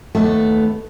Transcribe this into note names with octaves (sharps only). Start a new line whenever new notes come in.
D#2 A3 B3 A4